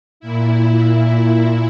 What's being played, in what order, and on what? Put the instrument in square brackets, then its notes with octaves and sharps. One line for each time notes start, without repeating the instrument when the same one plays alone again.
[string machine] A#2 E4